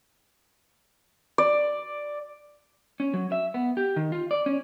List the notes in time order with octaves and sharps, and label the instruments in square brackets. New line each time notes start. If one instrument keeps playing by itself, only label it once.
[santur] D5
[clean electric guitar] C#4
F#3
E5
B3
G4
D#3
F4
D5
C#4